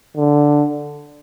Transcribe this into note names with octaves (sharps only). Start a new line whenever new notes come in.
D3